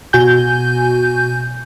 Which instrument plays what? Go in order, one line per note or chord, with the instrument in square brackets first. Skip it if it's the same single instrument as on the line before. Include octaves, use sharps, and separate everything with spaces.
[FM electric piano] B2 F#4 G#5 G6